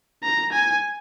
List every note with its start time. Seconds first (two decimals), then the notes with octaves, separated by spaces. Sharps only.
0.23 A#5
0.53 G#5